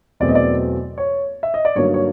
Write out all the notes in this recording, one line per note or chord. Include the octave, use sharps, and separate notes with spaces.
E2 B2 F#3 A3 C4 D5
D#5
D5
C#5
E5
D#5
D5
G2 D3 F#3 A#3 D#4 C#5
C#5